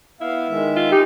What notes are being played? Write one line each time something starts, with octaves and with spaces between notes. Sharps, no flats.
B3 E4 F5
D#3 G#3 E5
F4
D#4 G4